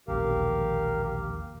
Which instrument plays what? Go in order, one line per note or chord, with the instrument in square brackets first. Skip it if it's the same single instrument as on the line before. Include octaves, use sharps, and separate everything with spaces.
[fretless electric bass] E1 A#1 D#2 [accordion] G4 A#4 F5